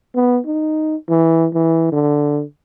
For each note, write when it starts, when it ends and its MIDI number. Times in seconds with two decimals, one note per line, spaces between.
0.15 0.39 59
0.46 0.96 63
1.09 1.48 52
1.54 1.91 52
1.92 2.43 50